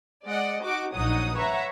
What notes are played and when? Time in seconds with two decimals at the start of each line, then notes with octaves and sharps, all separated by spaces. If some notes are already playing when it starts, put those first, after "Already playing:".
0.25 G#3 D5 D#5 F#5
0.62 D#4 F#4 D6
0.93 A#1 F#3 D#4 F#5 D#6
1.35 B4 C#5 E5 F#5 A#5